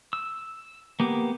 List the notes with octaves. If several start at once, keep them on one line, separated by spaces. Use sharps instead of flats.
E6
A#3 B3 G4